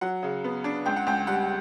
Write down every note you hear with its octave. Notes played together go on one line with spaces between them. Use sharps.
F#3 F#5
C#3
B3
D4
C#2 G5
F#5
C#2 G5
G3 F#5